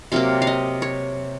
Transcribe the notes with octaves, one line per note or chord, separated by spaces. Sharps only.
C3 F#3 A#3 F5
F5
D#5
C#5